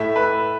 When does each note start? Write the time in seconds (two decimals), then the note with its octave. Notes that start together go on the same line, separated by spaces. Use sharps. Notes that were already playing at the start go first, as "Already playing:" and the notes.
Already playing: A2 A3 E5
0.16 B4